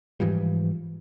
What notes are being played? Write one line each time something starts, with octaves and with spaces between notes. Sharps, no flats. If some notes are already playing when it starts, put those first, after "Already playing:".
G#2 E3 F3 G3